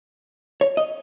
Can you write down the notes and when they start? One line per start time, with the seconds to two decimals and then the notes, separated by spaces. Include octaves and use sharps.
0.61 C#5
0.77 D#5